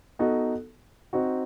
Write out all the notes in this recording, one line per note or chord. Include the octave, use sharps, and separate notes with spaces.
B3 D#4 F#4 A4
C4 D#4 F#4